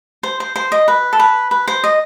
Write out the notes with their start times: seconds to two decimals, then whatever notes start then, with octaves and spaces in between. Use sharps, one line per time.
0.23 C5
0.40 C5
0.56 C5
0.72 D#5
0.88 B4
1.13 A4
1.19 B4
1.51 B4
1.68 C5
1.84 D#5